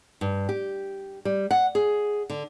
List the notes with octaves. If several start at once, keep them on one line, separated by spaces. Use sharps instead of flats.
G2
G4
G3
F#5
G#4
D3